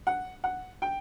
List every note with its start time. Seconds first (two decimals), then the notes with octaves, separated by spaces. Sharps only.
0.07 F#5
0.44 F#5
0.82 G5